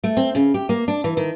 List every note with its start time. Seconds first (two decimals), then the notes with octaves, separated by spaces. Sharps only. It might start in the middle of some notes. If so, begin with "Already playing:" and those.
0.04 A3
0.17 C4
0.35 C#3
0.54 G4
0.69 A#3
0.88 D4
1.04 E3
1.17 D#3